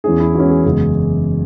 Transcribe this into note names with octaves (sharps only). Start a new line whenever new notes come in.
E2 E3 C#4 G#4
E4
E2 E3 C#4 F#4
G#4
F#1 E2 C#3 G#3 G#4